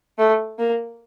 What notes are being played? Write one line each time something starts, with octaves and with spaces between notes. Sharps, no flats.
A3
A#3